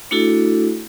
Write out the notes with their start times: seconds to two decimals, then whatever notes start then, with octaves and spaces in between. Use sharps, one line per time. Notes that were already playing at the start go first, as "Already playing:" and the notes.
0.11 A3 D4 E4 F#4 A4